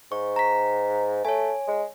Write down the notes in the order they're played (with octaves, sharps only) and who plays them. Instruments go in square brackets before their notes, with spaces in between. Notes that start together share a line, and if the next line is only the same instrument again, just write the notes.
[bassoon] G#2 [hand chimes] C#6
[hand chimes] A#5 B6
[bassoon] A3 [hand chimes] C#5 G#5
[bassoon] G#3